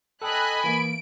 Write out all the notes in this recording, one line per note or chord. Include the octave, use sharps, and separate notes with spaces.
A4 D#5 G5 G#5 B5 D#6 F#6
E3 A#3 D7